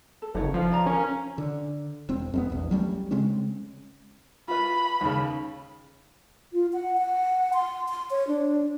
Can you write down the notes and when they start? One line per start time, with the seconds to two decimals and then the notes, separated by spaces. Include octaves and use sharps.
0.22 A4
0.35 F#1 D4 D#4 C#5
0.54 F3 B4 F5
0.72 D5 F5 A#5
0.86 C#4 A#4
1.38 D3
2.09 E1 C4
2.34 F2 A#3 B3
2.49 A#1 E2
2.71 F#3 G3 A3 C#4
3.11 C#3 G#3 C4 C#4
4.48 F4 B4 B5
5.01 D#2 C#3
6.53 F4
6.73 F#5
6.98 F#5
7.53 C6
7.88 C6
8.11 C#5
8.28 D4